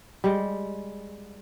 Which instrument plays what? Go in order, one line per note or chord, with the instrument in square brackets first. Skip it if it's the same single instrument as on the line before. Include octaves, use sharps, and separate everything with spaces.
[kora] G3 G#3